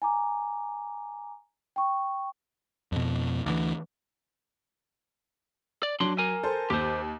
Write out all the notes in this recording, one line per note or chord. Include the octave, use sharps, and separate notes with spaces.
G#5 A#5 D6
G5 C#6
F2 B2
D2 E3
D5
F#3 D4 C6
A#4 G#5
A4 C5
D#2 G4 C5